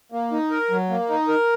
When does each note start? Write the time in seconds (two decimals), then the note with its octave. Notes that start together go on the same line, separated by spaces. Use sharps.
0.12 A#3
0.32 D#4
0.50 A#4
0.70 F#3
0.90 A#3
1.09 D#4
1.28 A#4